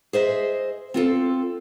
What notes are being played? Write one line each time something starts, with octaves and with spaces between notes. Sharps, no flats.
G#4 C5 D#5 E5
C4 F4 A4